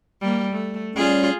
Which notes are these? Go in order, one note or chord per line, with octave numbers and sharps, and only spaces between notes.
G3 A#3
A3
G3 C#4 F4 G#4